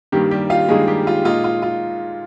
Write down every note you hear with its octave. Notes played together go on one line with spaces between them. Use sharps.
G2 D#3 G3 A#3 G4
G3 G4
F4 F5
G2 D#3 G#3 A#3 G#4
G3 G4
F4
A#2 G#3 D#4 F4
F4
F4